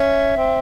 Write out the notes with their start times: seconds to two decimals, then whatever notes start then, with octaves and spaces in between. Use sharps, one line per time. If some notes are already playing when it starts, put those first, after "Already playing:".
Already playing: C#4 E5
0.37 C4